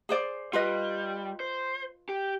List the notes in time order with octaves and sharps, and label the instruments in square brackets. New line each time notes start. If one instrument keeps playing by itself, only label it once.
[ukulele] G#4 C5 D5
[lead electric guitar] G3 [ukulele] F4 B4 D#5
[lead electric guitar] C5
G4